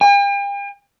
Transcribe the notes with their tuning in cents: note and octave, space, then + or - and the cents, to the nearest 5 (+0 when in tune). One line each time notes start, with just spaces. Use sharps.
G5 +45